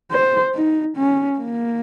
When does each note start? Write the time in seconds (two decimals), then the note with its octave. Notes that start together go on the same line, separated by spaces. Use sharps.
0.11 C5
0.55 D#4
0.97 C#4
1.39 A#3